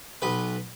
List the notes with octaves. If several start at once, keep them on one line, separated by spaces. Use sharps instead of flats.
B1 B4